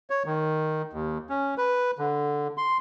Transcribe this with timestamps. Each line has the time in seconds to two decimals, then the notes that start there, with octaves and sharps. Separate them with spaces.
0.10 C#5
0.25 D#3
0.93 D#2
1.29 C#4
1.58 B4
1.99 D3
2.57 C6